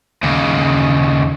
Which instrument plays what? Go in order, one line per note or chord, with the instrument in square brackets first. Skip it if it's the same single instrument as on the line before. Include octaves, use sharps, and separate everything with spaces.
[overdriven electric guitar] D#2 C#3